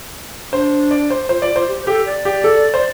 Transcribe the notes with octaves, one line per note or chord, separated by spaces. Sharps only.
D4 C5
D5
C5
F4 C5
F4 D5
F4 C5
G4
C5
G4 A4
D5
G4
A4
C5